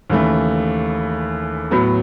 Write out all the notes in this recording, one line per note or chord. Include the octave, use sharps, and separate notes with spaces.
D#2 C#3 E3 A3
A2 F#3 B3